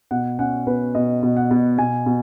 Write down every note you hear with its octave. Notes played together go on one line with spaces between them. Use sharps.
B2 F#5
C#4 F#5
B2 B4
B2 D#5
B2
F#5
B2
B2 G#5
B2